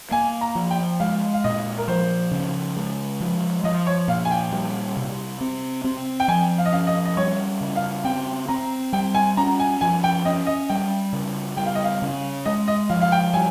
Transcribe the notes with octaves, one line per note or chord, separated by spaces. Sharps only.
A#3 G#5
A#5
F3
G5
G#3 F5
F5
A#2 D#5
A#4
F3 C5
C#3
G#3
F3
F3 D#5
C#5
A#2 F5
G#5
G5
G3
C3
C4
C4
G5
F3 G#5
F5
D#5
C#4 F5
D#5
D#5
G3 C#5
C#3
F5
C4 G5
C4 A#5
G3 G5
G#5
C#4 A#5
G#5
F3 G#5
G5
C#4 D#5
D#5
G3 G5
C#3
G3 G5
F5
D#5
F5
C#3
G#3 D#5
D#5
F3 F5
F5
G5
G3 G#5